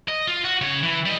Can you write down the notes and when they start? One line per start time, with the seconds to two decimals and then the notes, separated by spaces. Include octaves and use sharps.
0.08 D#5
0.28 F4
0.44 F#4
0.61 C#3 C#5
0.83 E3
1.06 G3 D#5